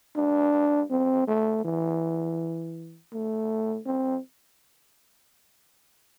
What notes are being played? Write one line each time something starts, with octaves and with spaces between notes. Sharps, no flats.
D4
C4
A3
E3
A3
C4